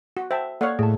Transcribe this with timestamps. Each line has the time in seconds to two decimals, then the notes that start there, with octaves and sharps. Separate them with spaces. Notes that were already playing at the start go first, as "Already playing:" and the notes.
0.17 F#4
0.31 C5 E5 G5 A5
0.61 A#3 A4 C#5 D5 F5 F#5
0.79 A2 G#4 A5